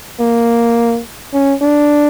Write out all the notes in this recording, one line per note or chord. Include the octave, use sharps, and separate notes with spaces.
A#3
C#4
D4